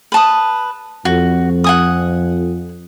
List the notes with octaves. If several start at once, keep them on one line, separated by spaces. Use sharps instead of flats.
B4 A5 D#6
F2 F#4
F#5 G#5 D#6